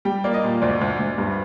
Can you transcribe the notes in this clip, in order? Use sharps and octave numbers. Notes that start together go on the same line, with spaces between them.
G3 G5
A#3 D5
D#5
A#2
D2 D5
D2
D2
G2